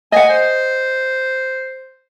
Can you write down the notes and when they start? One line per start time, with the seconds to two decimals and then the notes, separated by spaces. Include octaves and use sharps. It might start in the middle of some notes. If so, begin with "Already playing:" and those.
0.12 D#5 F#5 G#5
0.30 C5